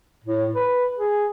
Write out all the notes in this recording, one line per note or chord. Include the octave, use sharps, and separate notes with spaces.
A2
B4
G#4